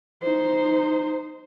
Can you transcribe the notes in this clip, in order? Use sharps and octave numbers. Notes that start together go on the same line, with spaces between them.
D#4 C5